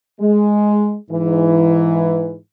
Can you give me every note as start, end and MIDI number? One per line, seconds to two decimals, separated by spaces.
0.21 0.96 56
1.11 2.37 44
1.11 2.37 52